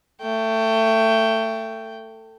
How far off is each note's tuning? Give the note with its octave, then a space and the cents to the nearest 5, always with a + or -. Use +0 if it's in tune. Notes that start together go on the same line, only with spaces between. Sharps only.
A3 +20 G5 -10